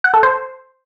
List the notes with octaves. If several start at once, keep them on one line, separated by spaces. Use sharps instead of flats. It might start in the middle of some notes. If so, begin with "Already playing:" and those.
F#5
A4
C5